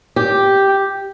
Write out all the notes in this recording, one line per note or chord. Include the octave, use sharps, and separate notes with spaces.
G4